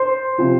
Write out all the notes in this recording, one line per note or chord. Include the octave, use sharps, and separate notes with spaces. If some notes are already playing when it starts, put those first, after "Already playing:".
Already playing: C5 C6
C3 F3 C4 F4